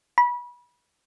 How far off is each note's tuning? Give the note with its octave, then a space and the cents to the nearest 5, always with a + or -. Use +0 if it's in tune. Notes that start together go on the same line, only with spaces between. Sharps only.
B5 -25